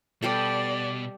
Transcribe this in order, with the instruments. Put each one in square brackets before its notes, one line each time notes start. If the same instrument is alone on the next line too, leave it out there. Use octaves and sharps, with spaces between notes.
[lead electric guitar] B2 [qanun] G3 G4 A4 [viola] D5